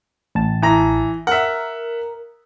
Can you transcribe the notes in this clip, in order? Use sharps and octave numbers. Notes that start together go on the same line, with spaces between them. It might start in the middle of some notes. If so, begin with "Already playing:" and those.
A1 A5
E3 A#5 A#6
A#4 E5 F#5